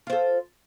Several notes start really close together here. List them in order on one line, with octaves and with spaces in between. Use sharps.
F4 C5 A4